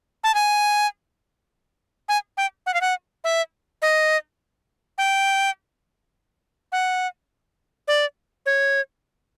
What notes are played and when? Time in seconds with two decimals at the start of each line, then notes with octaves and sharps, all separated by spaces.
0.24 A5
0.35 G#5
2.09 G#5
2.37 G5
2.66 F#5
2.74 F5
2.81 F#5
3.24 E5
3.82 D#5
4.98 G5
6.72 F#5
7.88 D5
8.46 C#5